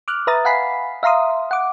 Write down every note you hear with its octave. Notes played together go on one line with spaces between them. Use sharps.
D6 F6 F#6
B4 E5 A#5 D#6 A6
F5 F#5 G#5 B5 B6 C7
E5 F5 A#5 C6 D#6
F#5 D6